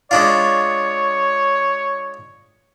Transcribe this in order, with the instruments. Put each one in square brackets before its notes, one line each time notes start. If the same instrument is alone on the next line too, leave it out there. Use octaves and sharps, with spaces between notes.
[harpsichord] G#3 D4 F4 [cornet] C#5